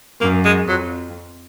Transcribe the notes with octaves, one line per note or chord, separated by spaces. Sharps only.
F#2 A#3
G#3
F2 F#3